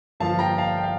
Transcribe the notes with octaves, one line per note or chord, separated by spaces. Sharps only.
G2 D3 F3 A#3 F5 A5
G5 A#5
F5 A5
G5
F5